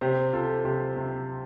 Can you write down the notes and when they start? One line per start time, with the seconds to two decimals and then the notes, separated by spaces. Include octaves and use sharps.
0.01 C3 G4 C5
0.33 C3 F4 A4
0.65 C3 G4 C5
0.96 C3